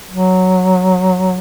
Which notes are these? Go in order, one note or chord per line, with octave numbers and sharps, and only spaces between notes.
F#3